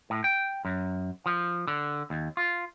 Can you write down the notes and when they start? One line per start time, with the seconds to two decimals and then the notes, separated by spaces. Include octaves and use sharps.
0.10 A2
0.24 G5
0.65 F#2
1.26 F3
1.67 D3
2.10 D#2
2.37 F4